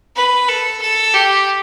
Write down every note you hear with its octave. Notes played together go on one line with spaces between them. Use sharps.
B4
A4
A4
G4